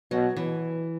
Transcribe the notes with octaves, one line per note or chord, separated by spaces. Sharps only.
B2 F#3
E3